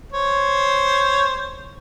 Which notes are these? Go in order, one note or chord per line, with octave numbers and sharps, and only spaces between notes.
C5 C#5